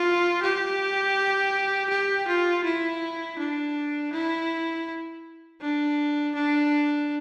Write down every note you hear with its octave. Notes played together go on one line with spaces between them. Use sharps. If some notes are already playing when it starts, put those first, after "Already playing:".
Already playing: F4
G4
G4
F4
E4
D4
E4
D4
D4